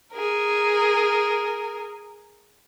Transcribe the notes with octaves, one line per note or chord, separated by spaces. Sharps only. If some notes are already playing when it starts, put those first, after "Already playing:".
G#4 A#4